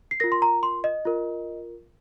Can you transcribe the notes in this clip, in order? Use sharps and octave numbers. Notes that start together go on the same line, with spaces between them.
C7
F4 A#4 A#6
C6
A#5
C6
D#5
F4 A#4